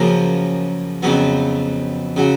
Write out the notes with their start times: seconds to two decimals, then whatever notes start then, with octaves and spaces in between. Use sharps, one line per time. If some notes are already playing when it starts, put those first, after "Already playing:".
Already playing: F#2 C#3 F3 A#3
1.02 F2 C#3 F#3 B3
2.16 C#3 F#3